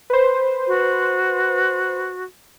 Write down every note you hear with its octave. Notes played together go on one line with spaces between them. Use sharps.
B4 C5
F#4